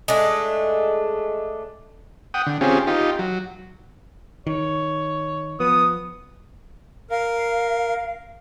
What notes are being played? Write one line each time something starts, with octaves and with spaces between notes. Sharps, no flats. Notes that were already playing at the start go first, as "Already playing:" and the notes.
G#3 A3 D4
F#5 G5 D#6
D3
C4 C#4 F4 G4 G#4
D#4 F4 G4
F#3
D#3 C#5
F3 B3 D#6
A#4 F5